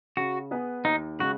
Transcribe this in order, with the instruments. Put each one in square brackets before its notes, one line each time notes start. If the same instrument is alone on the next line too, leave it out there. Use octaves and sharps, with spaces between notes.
[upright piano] C#3 [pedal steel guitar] F#4
[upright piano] B3 G#4 B4
[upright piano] D#2 [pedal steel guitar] D#4
[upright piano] C#3 G#3 [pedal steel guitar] F#4